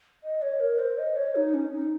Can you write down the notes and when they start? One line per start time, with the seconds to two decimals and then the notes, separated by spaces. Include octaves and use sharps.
0.24 D#5
0.42 C#5
0.60 A#4
0.79 C5
0.98 D#5
1.16 C#5
1.36 D#4
1.54 C#4
1.72 D#4